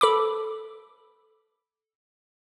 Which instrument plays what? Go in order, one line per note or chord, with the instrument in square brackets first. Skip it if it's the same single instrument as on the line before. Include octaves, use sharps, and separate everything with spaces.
[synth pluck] A4 B5 D6